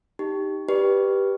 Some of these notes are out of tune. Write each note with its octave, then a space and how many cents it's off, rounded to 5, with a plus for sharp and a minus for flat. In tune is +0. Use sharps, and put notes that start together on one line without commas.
D#4 +0 G4 +0
G4 +0 B4 -10 D5 +0